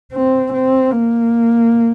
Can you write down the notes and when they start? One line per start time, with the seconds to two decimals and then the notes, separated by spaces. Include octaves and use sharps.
0.13 C4
0.53 C4
0.91 A#3